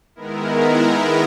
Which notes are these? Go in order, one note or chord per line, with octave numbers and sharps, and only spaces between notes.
D#3 G#3 B3 E4 A#4